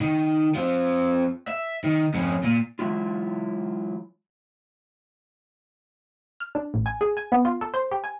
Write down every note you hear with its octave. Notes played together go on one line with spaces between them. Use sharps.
D#3
F3 C4
E5
D#3
F2 C#4
A#2
E3 F#3 G#3 E4 F4
F6
D4
A1
G#5
G#4
G#5
B3
F4
A4
C5
G4
G#5